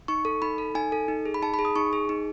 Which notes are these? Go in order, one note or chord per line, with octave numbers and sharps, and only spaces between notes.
D#4 C#6
A4
D#4 B5
A4
D#4 G#5
A4
D#4
G#4
B5
D#4 A5
B5
G#4
D#6
D#4 C#6
G#4
D#4